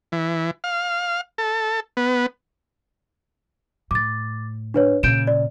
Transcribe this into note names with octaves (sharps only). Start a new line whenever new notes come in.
E3
F5
A4
B3
A2 D6 A6
D4 B4 C#5
A#2 C#3 G6 D7 E7
D5